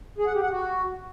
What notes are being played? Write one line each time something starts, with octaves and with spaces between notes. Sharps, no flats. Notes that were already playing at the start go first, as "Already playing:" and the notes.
G#4
F#5
G4
F#5
F#4